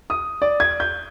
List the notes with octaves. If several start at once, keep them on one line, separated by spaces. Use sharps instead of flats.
D#6
D5
G#6
G6